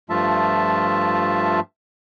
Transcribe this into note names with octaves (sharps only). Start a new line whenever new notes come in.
G2 F3 A3 F4 E5 A5